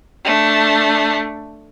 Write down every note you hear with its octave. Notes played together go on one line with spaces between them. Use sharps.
A3 D4